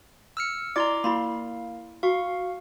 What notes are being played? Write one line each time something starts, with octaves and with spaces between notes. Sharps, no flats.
E6 F6 C#7
E4 D5 D#5 A#5 C6 D6
A#3 E4 F5 B5 C6
F#4 F5 C#6